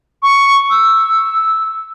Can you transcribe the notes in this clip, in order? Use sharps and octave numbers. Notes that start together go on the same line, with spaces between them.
C#6
E6